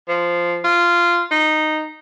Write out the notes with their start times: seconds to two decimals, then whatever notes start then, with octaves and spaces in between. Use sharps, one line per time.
0.08 F3
0.64 F4
1.31 D#4